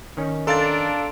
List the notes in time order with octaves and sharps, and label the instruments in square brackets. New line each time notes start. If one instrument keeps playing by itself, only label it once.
[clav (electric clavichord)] D#3 C#4 D#4
[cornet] D4 [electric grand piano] A4 F5 A6 [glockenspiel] A#5 C6 D7